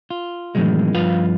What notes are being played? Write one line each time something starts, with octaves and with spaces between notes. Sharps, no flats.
F4
A2 C3 D#3 E3 F#3 G#3
G2 F3 F4 B4 F5